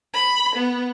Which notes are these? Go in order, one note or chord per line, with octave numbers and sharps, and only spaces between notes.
B5
B3